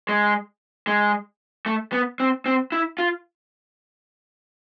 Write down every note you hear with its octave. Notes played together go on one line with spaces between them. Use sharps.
G#3
G#3
A3
B3
C4
C4
E4
F4